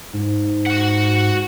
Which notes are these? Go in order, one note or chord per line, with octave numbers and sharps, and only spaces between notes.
G#2
F#4 F#5